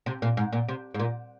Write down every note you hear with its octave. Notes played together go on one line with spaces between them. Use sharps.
C3
A#2
G#2
A#2
C3
G#2
A#2